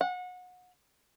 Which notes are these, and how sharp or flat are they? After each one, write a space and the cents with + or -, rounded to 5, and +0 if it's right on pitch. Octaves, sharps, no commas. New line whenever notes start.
F#5 -30